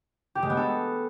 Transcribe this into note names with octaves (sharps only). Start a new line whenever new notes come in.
G4
G#3
B3
A4